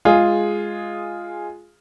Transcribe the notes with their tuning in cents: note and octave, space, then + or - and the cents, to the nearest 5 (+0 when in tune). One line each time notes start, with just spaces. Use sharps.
G#3 +0 F4 +0 G#4 -5